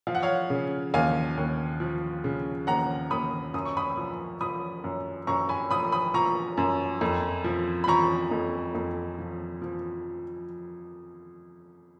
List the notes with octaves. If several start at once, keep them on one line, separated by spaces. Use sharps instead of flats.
F3 F5
F#5
C#5 F5
C#3
D#2 F5 G#5
D#2
F3
C#3
D#2 F#5 A#5
D#2 B5 D#6
F#2 D#6
C#6
B5 D#6
F3
F3 B5 D#6
F#2
F#2 A#5 C#6
G#5 B5
F3 B5 D#6
B5 D#6
F3 A#5 C#6
F#2
F2
F3
B5
F3 A#5 C#6
F2
F2
F3
F3